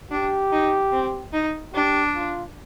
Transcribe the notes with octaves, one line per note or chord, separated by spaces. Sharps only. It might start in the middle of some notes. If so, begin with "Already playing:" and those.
D4 G4
D#4
C4
D#4
D4 G4
F4